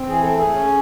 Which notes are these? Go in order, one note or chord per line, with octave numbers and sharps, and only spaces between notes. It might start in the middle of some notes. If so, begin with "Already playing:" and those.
Already playing: C4
E3 G#4
A4
A3
G#4
C#4